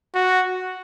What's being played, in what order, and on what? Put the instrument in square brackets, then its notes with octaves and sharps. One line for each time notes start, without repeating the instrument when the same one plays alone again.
[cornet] F#4